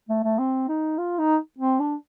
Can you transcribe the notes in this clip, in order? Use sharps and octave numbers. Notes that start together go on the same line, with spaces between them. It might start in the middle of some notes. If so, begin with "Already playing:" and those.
A3
A3
C4
D#4
F4
D#4
C4
D4